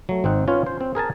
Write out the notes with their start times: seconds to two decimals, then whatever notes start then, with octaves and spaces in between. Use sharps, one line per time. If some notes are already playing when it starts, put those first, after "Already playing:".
0.09 F#3 A3
0.24 G#1 C4 D#4 F#5
0.48 C#4 F4 B4 C#5
0.66 C5
0.81 C4
0.95 G#4 A#4 G#5 A5